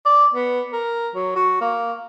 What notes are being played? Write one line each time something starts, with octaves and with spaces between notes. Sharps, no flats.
D5
B3
A#4
F#3
F#4
A#3